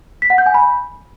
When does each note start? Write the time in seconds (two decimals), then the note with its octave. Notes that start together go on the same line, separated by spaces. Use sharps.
0.22 B6
0.30 F#5
0.38 G6
0.46 G#5
0.54 B5